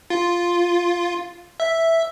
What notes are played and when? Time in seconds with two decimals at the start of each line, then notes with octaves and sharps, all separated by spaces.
0.10 F4
1.60 E5